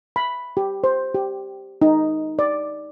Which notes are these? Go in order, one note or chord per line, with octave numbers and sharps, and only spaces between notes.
B5
G4
C5
G4
D#4
D5